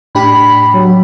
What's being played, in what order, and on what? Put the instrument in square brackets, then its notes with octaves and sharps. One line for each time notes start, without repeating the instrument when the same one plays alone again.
[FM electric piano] A2 D4 G4 [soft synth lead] B5
[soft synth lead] F#3